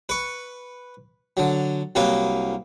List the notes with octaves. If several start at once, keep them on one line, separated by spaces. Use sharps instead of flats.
B4 C#6
D3 F#3
C2 F#3 A#3 B4